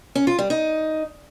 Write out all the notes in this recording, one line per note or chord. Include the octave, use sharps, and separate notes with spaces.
C#4
F4
G3
D#4